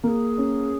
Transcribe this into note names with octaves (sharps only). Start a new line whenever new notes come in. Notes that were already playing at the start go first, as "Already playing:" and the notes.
A#3 G#4 A#4
C#4